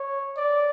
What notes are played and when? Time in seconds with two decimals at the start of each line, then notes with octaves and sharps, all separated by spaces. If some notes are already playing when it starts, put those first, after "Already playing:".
Already playing: C#5
0.37 D5